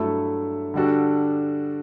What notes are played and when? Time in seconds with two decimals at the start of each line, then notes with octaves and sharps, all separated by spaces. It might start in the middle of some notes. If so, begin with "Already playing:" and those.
Already playing: G2 F#3 A3 E4 A4
0.74 D3 G3 D4 F#4 A4